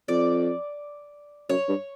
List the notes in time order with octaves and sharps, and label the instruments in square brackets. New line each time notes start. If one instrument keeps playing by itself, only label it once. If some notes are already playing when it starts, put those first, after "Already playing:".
[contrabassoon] F2 [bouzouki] D5
[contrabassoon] F#2 [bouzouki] C#5
[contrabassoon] G2